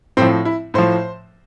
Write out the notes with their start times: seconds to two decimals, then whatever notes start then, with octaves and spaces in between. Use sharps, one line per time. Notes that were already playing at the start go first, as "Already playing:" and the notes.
0.17 A2 F3 C4
0.45 E4
0.74 A2 F3 C5